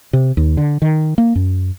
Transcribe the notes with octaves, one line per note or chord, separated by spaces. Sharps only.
C3
D#2
D3
D#3
A#3
F#2